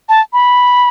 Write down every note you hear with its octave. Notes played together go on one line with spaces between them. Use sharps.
A5
B5